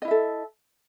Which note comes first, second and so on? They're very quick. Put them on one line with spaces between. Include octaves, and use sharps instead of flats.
D#5 E4 E5 A4